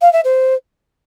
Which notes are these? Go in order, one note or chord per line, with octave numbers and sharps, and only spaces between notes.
F5
E5
C5